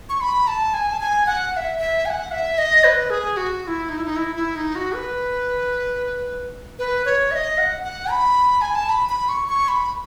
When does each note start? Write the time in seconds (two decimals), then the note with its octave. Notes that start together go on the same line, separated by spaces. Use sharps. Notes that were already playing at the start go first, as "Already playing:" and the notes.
0.09 C#6
0.21 B5
0.47 A5
0.74 G#5
0.92 A5
1.00 G#5
1.27 F#5
1.53 F#5
1.57 E5
1.79 E5
2.05 G#5
2.10 F#5
2.32 E5
2.58 D#5
2.84 B4
3.10 G#4
3.37 F#4
3.63 F#4
3.67 E4
3.89 D#4
3.97 E4
4.05 D#4
4.16 E4
4.36 E4
4.55 D#4
4.75 F#4
4.95 B4
6.79 B4
7.05 C#5
7.31 E5
7.35 D#5
7.58 F#5
7.84 F#5
8.11 B5
8.61 G#5
8.75 A5
8.89 B5
9.09 B5
9.29 C#6
9.48 C#6
9.68 B5